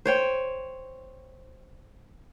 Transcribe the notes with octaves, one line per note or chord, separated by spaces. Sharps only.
C5 C#5 G5